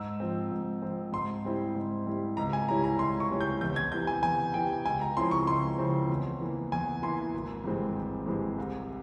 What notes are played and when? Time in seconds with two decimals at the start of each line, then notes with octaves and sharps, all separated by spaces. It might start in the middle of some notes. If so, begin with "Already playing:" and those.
Already playing: G#2 E6
0.20 F3 C4
0.51 G#2
0.82 F3 C4
1.12 G#2 C6
1.45 G3 C4 E4
1.75 G#2
2.07 G3 C4 E4
2.37 C#2 A#5
2.53 G#5
2.68 C3 G3 C#4 E4 A#5
2.84 A#5
2.99 C#2 C6
3.20 C#6
3.30 C3 G3 C#4 E4
3.41 G6
3.61 E2 G6
3.76 G#6
3.92 C3 E3 G6
4.07 G#5
4.23 E2 G#5
4.54 C3 E3 G5
4.85 C#2 G#5
5.01 A#5
5.17 C#3 F3 C4 E4 C6
5.31 C#6
5.47 C#2 C6
5.78 C#3 F3 C4 E4
6.09 E2
6.41 E3 A#3 E4
6.72 E2 G#5
7.03 E3 A#3 E4 C6
7.33 G#1
7.64 G2 E3 G#3 C4
7.95 G#1
8.26 G2 E3 G#3 C4
8.58 C2